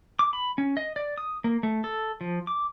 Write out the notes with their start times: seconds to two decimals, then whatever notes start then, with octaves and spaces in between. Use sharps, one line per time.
0.19 D6
0.33 B5
0.58 C#4
0.77 D#5
0.96 D5
1.18 D#6
1.44 A#3
1.63 A3
1.84 A4
2.21 F3
2.47 D6